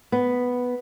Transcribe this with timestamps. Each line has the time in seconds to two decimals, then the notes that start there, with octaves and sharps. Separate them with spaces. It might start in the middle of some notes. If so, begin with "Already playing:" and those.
0.12 B3